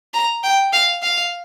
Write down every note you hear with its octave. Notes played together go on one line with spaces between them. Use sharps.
A#5
G5
F5
F5